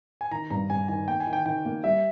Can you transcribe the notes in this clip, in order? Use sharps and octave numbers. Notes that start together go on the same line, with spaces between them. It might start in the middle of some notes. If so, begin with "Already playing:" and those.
G#5
D#3 A#5
G2 A#5
G2 G#5
D#3 G#5
A#3 G5
G#5
D#3
G5
D#3 G5
A#3
G3 E5